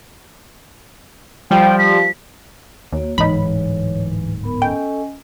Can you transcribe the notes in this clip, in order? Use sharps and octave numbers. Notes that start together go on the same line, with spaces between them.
F3 G3 G5
B6
D#2 A#3 F#4 C#5
D1 G1 G#2 E3 D#4 C#5 B5
B3 A#4 B5
C#4 A4 D#5 G5 G#5